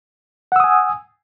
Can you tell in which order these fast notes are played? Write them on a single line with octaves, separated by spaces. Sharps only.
F#5 E6 D#6 G#5